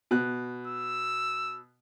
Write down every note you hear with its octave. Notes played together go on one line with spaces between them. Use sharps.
B2 F#6
E6